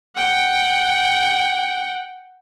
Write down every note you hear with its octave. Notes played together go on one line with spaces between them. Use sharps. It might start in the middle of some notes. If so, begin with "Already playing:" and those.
F#5 G5